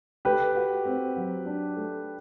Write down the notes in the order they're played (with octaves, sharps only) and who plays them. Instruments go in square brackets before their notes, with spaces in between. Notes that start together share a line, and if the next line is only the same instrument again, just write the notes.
[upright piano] A3 [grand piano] G4 B4
[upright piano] F#4
C4
F#3
D4
A3